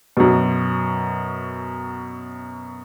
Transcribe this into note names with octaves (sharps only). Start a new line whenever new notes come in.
F#2 B2